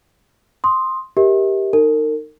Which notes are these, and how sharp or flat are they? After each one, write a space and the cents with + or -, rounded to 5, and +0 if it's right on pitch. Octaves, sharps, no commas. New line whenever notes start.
C6 +5 D#6 +0
G4 +0 A#4 +15 E5 -40
D#4 -15 A#4 -35